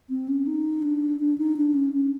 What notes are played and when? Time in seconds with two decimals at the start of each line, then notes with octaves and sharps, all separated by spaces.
0.10 C4
0.28 C#4
0.47 D#4
0.82 D4
1.20 D4
1.38 D#4
1.57 D4
1.74 C#4
1.93 C#4